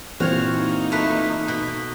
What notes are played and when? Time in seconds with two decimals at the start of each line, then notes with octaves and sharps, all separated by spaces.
0.20 A#2 E3 C4 F#4 C5 C#5 F6
0.50 A#3 D#4
0.92 A3 B4
1.48 B2